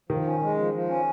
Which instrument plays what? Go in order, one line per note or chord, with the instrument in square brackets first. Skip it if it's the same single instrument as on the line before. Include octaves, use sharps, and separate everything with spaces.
[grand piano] D#3 [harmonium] F3
[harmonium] C#4
G#3
F3
F3
C#4